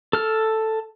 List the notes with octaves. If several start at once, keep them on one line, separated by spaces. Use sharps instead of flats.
A4 F6